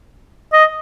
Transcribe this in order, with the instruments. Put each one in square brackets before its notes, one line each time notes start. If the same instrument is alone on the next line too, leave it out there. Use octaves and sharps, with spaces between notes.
[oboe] D#5